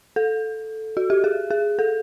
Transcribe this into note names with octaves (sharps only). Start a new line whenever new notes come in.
A4
F#4
G4
G#4
G#4
A4